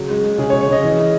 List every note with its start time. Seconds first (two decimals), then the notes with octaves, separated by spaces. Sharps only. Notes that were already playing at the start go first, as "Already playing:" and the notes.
Already playing: C#3 F#3
0.10 G#3
0.24 G#3
0.38 C#3 G#4
0.50 C#5
0.53 C#3
0.61 C#5
0.69 C#3 D#5
0.83 E3
0.99 E4